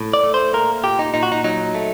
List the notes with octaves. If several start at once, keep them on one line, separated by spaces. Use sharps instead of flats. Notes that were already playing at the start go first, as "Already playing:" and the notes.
Already playing: A2
D5
A3
C5
A#3 A#4
A#2 G4
D#4
A#2 D#4
F#4
D#4
F#3 D#4
A3